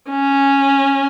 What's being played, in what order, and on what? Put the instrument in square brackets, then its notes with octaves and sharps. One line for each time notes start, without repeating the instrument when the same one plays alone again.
[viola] C#4